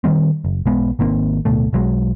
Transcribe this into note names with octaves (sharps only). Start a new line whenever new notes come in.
D#3 F#3 G3 C4
F#1
B1 G#3 B3
G#1 D#3 A#3 C4
D1 B2 A3
B1 F#3 G#3